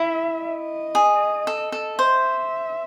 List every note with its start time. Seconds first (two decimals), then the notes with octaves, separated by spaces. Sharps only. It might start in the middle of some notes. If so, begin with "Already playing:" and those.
Already playing: E4 E5
0.43 D#5
0.95 G#4
1.47 A4
1.72 A4
1.99 C5 E5